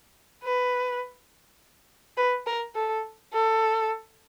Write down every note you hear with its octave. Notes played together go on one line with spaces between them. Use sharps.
B4
B4
A#4
A4
A4